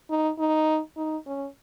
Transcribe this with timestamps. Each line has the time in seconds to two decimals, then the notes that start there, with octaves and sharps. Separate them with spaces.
0.10 D#4
0.39 D#4
0.97 D#4
1.26 C#4